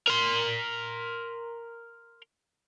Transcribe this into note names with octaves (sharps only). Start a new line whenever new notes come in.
A#4 C6